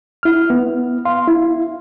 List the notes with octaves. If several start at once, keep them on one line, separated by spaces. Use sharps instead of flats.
E4 F6
B3
F5 C6
E4